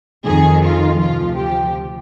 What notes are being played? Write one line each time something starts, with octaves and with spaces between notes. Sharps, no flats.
F2 D#3 G#4
F4
D2 C3 F3 F4
G4